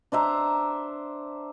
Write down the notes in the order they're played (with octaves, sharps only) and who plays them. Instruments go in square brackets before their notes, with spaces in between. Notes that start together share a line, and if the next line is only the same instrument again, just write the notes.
[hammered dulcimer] D4 C5 E5 A#5